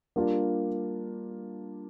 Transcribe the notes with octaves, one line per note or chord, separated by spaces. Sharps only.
G3 A#3 D4 F4 A#4